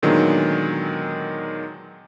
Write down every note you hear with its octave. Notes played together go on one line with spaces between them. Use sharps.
A#2 D3 D#3 F#3 G#3 B3